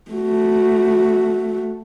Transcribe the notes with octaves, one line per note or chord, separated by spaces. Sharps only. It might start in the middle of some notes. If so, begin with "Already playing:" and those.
A3 F#4